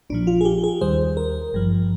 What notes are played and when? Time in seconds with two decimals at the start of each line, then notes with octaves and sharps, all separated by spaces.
0.10 A#1 A#2 F3 D4
0.27 F4
0.41 G#4
0.45 G4
0.64 G#4
0.81 D#2 D#3 G3 C5
1.17 A#4
1.53 G#1 G2 F3